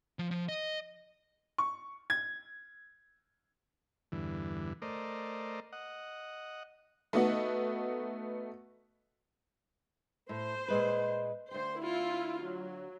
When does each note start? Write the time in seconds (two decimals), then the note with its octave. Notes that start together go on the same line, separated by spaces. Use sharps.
0.19 F3
0.31 F3
0.49 D#5
1.58 C#6
2.10 G#6
4.12 E2 G2 D3 E3
4.82 A3 A#4 C5 D5 D#5
5.72 D#5 F#5
7.13 A3 B3 D#4 F#4 D#5 F#5
10.29 A2 C5
10.68 A#2 G#3 B4
11.51 D2 C5 G5
11.81 E4 F4
12.41 F#3